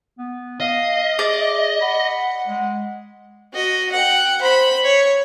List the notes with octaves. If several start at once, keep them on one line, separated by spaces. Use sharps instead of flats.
B3
D#5 F5
G#4 D5 E5
F#5 B5
G#3
F#4 D#5
F#5 G5
C5 B5
C#5